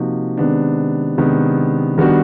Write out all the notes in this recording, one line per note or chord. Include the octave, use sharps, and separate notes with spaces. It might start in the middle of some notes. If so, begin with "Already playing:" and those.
Already playing: C3 F3 A#3 D#4 F#4
C3 D#3 G#3 B3 D4
C3 D#3 G#3 B3 D4
D#3 G3 B3 D4 F#4